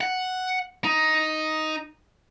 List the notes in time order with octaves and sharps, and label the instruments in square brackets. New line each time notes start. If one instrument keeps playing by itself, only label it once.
[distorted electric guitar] F#5
D#4